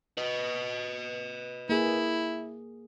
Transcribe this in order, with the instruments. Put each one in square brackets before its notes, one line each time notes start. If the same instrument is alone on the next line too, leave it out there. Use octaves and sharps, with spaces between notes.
[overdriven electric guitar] B4 D#5
[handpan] A#3 G#4 [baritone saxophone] E4